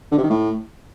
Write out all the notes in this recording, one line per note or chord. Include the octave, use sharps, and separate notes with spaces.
D3
C3
D#3
A2